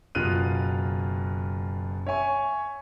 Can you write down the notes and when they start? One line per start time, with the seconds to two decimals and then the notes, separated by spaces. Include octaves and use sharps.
0.15 F#1 B2 F4 F6 F#6 D#7
2.06 C#5 E5 G#5 C#6